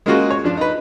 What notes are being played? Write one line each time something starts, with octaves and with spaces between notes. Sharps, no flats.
G#3 A#3 C#4 F4 F#4 G#4
C#5
F3 D4
D#4 B4